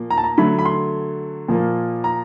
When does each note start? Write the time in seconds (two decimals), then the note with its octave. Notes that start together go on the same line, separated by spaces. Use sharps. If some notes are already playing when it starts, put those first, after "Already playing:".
Already playing: A#2 F3 A#3
0.10 A#5
0.18 A5
0.24 A#5
0.38 D3 F#3 A3 B5
0.59 B5
0.66 C6
1.48 A#2 F3 A#3
2.04 A#5